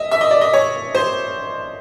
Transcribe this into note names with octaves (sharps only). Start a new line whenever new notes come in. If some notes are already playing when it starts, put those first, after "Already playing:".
Already playing: D#5 E5
E5
D#5
D5
D#5
C#5
C5